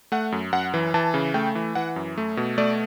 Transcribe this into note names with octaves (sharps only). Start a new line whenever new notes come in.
A3 F#5
F#2
F#2 F#5
E3
E3 A5
C#3
A3 G5
E3
E3 F#5
F#2
A3
B2
A3 D5